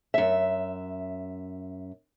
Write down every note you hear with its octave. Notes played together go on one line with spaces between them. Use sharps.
F#2 E5